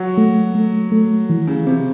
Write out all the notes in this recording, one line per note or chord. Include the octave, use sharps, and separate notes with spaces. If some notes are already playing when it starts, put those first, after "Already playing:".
Already playing: F#3
A3
A3
A3
E3
C#3
C3 C4